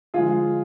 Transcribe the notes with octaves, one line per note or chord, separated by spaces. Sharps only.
D3 F3 G#3 F4 G#4